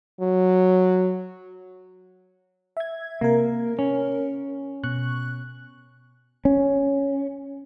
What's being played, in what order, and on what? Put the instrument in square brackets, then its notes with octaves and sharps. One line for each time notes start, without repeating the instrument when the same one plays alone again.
[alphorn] F#3
[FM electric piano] E5 G#6
[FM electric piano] C3 A#4 [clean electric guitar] A#3
[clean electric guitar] C#4
[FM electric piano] B2 C#6 F#6
[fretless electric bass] C#4